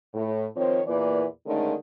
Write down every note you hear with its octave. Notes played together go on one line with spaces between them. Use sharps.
A2
D#3 F3 C4 C5 C#5
E2 A#2 E3 A#3 B4 D5
D3 D#3 G#3 A3 C#4 D#4